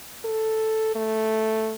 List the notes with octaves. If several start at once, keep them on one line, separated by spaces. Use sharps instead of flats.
A4
A3